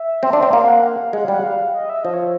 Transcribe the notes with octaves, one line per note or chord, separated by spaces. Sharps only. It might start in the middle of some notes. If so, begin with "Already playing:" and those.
Already playing: E5
C4
D4
C4
A#3 F5
F#5
F5
F5
G#3 F#5
G3 F5
F#5
F5
D#5
E5
F3 D#5
C#5